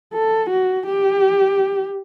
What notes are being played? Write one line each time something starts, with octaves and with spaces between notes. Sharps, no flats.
A4
F#4
G4